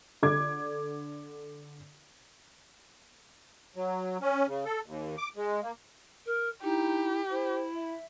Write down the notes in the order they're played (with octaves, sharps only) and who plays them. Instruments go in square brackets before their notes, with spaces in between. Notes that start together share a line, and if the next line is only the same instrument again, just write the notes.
[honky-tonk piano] D3 D6 G#6
[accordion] F#3
C#4
C#3
A4
D#2
D6
G#3
A#3
[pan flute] A#4
[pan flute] D#4 [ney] E4 [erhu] G4
[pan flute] E4 [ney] C5
[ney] E5